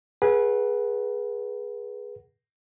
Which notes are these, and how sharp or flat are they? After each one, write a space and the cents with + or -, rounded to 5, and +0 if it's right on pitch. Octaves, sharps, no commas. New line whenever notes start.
G#4 +0 B4 -25 F#5 +10